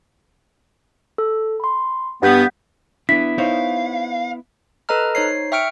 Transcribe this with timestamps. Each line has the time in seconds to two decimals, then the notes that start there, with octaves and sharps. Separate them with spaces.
1.18 A4
1.60 B5 C6
2.22 G2 B3 F#5 G6 B6
3.09 B3 D4 E4 B6
3.38 D#4 C5 C#5 F5
4.89 A4 B4 D#5 A#5 F6
5.15 D#4 C5 C#5 C7
5.52 E5 G5 C#6 F6 C#7 D7